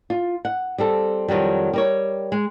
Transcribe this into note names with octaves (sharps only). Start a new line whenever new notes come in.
F4
F#5
G3 C4 A4
F2 D#3 F#3 G3
G3 A#4 C#5
G#3